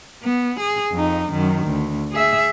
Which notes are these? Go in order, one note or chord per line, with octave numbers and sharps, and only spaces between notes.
B3
G#4
F2 D#4
F#2 D#3
D2
G#4 E5